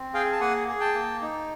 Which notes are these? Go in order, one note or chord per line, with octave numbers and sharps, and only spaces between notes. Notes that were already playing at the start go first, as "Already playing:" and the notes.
Already playing: C4
G#4 F5 G5
A5
A#3 F#5 G#5
G#4
G5 A5
A#3
D#4